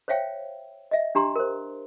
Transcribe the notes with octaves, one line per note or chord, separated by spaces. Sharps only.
C5 C#5 E5 F5 G5
D#5 E5
D4 G4 A#5 C6
A#4 C5